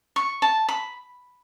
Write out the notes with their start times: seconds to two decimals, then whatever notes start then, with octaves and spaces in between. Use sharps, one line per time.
0.16 C#6
0.42 A5
0.68 B5